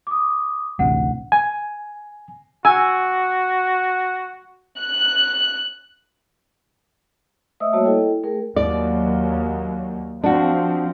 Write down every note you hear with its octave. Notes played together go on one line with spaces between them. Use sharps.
D6 D#6
A1 D2 C3 F#5
G#5
F#4 G#5 E6
F#6
A3 C5 D#5 E5 D#6 E6
G3 A#3 F#4 C#5 A5
E4 A4 D#5 G5
A3 G#4 A#4 G5
D#2 F#3 D5
F3 C4 D4 F#4